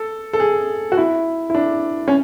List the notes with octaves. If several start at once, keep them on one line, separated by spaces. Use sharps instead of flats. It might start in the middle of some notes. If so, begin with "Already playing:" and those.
Already playing: A4
A4
G#4
F#4
E4
E4
D4
C#4